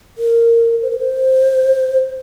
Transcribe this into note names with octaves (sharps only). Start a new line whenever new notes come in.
A#4
C5
A#4
C5